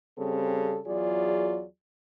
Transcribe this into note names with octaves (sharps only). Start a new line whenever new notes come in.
C#3 G3 C4 A4
E2 F#3 F4 G#4 D5